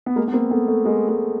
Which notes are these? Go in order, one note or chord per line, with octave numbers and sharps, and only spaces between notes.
B3
G#3 A#3
B3
A#3 C4
A3 B3
A3
G#3 A#3
G#3 A#3